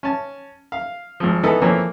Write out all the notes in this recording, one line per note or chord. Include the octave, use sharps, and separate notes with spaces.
C#4 A5
F5
G#1 F3
E3 B3 D#4 E4 A4
E3 F3 A#3 C4 A4 C#5